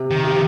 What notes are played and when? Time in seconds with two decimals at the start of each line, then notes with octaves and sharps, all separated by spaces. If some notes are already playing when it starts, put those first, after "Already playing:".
Already playing: C3
0.11 D#3
0.24 C3
0.31 F3